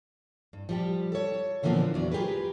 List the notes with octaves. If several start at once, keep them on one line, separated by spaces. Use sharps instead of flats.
G2
F3 G3 G4
A4 C#5
A#2 D3 E3 F3 A#3 B3
E2 F#3 D5
F4 G4 G#4 A#4 B4